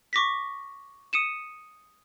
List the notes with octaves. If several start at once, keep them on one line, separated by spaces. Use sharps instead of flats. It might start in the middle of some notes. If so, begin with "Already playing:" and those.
C#6 D6 A#6 B6
D#6 C#7 D#7 E7